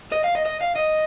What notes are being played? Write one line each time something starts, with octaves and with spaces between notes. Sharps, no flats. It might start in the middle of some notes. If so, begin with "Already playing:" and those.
D#5
F5
D#5
D#5
F5
D#5